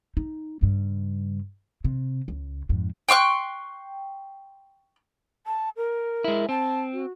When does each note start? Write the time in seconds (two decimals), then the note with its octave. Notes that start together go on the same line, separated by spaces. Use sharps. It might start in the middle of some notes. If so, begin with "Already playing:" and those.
0.17 D#4
0.61 G2 C#3
1.84 C3
2.28 C#2
2.69 F2 G#2
3.08 G5 C6 C#6 F#6
5.45 A5
5.77 A#4
6.24 G#3 E4
6.49 C4 A5
6.93 F#4